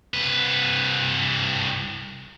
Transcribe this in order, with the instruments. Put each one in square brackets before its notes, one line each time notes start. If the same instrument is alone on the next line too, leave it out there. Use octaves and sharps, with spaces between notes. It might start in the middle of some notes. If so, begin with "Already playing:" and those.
[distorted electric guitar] C2 B4